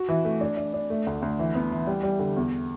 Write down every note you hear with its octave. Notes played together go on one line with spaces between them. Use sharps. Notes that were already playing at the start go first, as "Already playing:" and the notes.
Already playing: F#4
E3
A3
D4
D4
D4
A3
D2
D2
E3
B3
E3
G3
G3
D3
E2